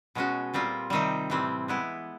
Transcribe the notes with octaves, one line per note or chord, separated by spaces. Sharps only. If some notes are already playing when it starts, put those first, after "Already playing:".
B2 G#3 C#4 F#4
A#2 G3 C4 F4
C3 D#3 G3 C4 D#4
A2 E3 G3 C4
G#3 B3 E4